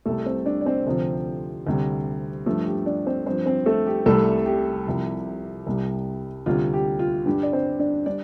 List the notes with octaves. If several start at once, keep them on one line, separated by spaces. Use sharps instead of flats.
C2 C3 G3 A3 A4
C4 C5
D4 D5
D5
C4 C5
D2 C3 F3
D2 C3 G3
G2 F3 A3 A4
G4
D4 D5
C4 C5
G2 F3 C4 C5
C4 C5
A3 A4
G4
C2 C3 G3 A3 A4
G4
C2 C3 F3
C2 C3 G3
D2 C3 G3 F4
G4
F4
G2 D3 G3 G4
D5
C4 C5
D4 D5
G3 D4 D5